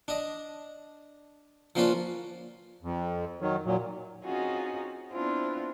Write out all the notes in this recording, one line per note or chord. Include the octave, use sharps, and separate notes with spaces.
D4 D#5
F3 A#3 C#4 D4 F4 B4
F2
D#3 F#3
A#2 F#3
C4 C#4 D#4 F4 F#4 G#4
B3 C4 D4 E4 F4 C5